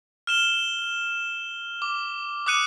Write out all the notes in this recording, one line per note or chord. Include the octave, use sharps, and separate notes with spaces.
F6 E7 G7
D6
D6 D#6 F#6 C#7 D#7